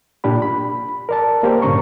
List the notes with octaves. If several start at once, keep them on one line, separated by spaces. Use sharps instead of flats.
A#2 D4 G4 B5
B5
A#4 D5 A5
A#3 G4 A#4 C5
G2 A#2 D3 C#4 A#5 C#6